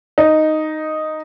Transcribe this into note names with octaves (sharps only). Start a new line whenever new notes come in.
D#4